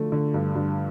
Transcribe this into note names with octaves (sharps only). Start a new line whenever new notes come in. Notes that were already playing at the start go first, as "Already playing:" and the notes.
Already playing: D3 F3 A3
D3
G2
G2